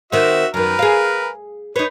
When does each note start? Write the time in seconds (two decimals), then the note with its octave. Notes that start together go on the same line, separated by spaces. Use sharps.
0.12 D#3 C4 F#4 E5
0.54 F#2 D#3 A#4 B4
0.79 G#4 F5
1.76 D#4 B4 C#5